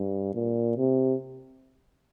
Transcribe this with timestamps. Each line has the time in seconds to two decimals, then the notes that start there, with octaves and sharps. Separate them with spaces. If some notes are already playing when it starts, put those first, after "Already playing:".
Already playing: G2
0.35 A#2
0.77 C3